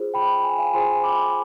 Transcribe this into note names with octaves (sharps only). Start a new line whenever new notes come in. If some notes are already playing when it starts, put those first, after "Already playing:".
Already playing: F4 G#4 C5
G5 B5
G#5
G5
F5 G#5
F4 G#4 C5 G#5 C6
B5 D6